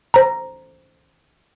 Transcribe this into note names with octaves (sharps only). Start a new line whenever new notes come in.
C5 A#5